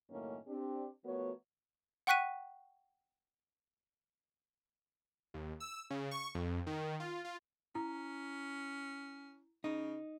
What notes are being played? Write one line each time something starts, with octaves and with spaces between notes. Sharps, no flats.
F#2 A2 D#3 A#3 C#4
C4 D4 G4
F3 A3 B3 F#4 A#4 C#5
F#5 G5 C#6 F#6 B6 D#7
D#2
E6
C#3
C#6
F2
D#3
F4
F4
C#4 E4 A#5
C#3 D#4